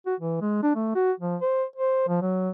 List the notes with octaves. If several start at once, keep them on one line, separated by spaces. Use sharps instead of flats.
F#4
E3
G#3
D4
A3
F#4
F3
C5
C5
F3
F#3